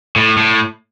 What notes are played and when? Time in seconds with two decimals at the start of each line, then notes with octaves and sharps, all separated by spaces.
0.16 A2
0.37 A2